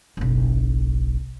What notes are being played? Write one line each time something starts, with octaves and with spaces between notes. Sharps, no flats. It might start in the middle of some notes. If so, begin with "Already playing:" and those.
F#1 B1